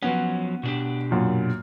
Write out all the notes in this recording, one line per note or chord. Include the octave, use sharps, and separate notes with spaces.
F3 F#3 B3 C#4
B2 D4 G4
F#2 A#2